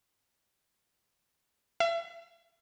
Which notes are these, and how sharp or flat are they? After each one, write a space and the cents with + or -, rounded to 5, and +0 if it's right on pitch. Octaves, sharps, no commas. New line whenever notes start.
E5 +35